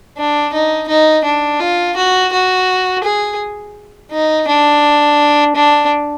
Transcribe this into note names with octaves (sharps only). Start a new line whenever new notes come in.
D4
D#4
D#4
D4
F4
F#4
F#4
G#4
D#4
D4
D4